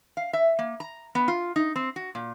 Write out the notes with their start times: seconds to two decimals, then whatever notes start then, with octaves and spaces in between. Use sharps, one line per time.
0.17 F5
0.33 E5
0.59 A#3
0.80 A#5
1.15 B3
1.28 F4
1.56 D#4
1.76 C4
1.96 F#4
2.15 A#2